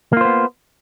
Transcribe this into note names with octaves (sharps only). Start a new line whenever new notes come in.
A#3 B3 F4 C5